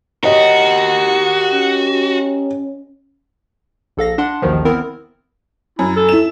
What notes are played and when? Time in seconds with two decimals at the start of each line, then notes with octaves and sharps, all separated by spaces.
0.23 F#4 G4 A#4 C#5 D#5
1.53 C#4
3.97 A#1 A4 F5 A#6
4.18 D4 F#5 C6
4.42 A1 D#2 B2 D#3 F3
4.65 B3 C4 E4 A#4
5.79 F#2 E4
5.96 A4
6.09 E4 E7